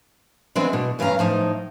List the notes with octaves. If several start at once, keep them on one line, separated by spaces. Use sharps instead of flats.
E3 G#3 B3 C4 D4
B2
G2 E3 C#4 F5 A#5
A2 F3 D#4